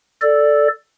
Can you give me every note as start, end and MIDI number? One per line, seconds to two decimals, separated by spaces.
0.22 0.68 69
0.22 0.68 74